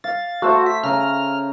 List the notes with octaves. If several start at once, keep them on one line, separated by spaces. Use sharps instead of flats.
F5 A6
A3 F#4 C5 E5
B6
C#3 A#5 F6